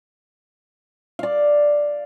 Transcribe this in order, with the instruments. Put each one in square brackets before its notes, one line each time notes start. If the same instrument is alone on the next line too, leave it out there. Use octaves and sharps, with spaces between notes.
[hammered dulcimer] D5 F5